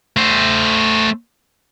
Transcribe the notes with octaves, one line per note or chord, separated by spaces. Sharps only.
A3 C5